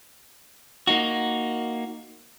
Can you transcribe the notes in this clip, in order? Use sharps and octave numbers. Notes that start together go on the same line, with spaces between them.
A#3 D#4 F#4